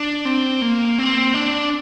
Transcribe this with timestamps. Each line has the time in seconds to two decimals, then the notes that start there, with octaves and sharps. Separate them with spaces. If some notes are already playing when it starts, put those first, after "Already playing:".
Already playing: D4
0.25 C4
0.62 A#3
0.98 C4
1.34 D4